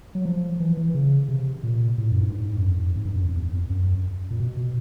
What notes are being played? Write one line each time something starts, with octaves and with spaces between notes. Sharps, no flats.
F#3
F3
E3
E3
C#3
C3
A#2
A2
F#2
G2
G#2
F#2
F2
G#2
G2
F#2
F2
E2
F2
F#2
A#2
B2
B2